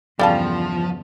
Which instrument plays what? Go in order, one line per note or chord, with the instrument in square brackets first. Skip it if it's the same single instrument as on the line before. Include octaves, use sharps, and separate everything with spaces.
[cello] E2 G2 [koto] C#3 G3 [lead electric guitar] F3 [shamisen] A4 F5 A5